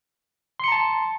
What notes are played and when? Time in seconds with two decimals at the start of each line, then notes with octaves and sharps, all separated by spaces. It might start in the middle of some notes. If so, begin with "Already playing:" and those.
0.60 C6
0.64 C#7
0.68 A#5
0.72 A5